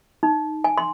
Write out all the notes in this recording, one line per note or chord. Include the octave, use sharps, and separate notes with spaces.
D#4
G#5
C6